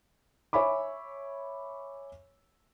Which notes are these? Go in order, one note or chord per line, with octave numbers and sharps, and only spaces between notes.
C#5 E5 G#5 B5 D6